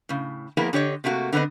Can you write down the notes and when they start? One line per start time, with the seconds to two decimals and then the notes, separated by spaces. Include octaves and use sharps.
0.09 A2 C#3
0.57 F3 A#3 B3 E4 G#4 A#4
0.73 D3 G4 C#5 D#5
1.04 C3 A3 A#3 F4 F#4
1.33 D3 B3 C4 B4 D#5